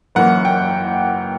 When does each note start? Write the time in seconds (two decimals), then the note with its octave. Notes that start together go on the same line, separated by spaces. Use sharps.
0.15 F#1 F#2 E3 A#3 F#5
0.45 G5